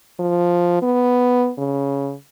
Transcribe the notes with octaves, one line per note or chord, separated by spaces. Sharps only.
F3
B3
C#3